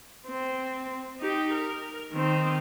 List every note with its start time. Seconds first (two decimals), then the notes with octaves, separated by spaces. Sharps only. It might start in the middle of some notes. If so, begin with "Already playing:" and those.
0.27 C4
1.20 D#4 G4
1.53 A#4
2.13 D#3 C4